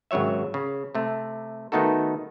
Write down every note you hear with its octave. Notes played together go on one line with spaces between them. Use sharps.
G#1 C#3 F#3 C#5 E5
C#3
C3 A3
D#3 A3 B3 D#4 F#4 A4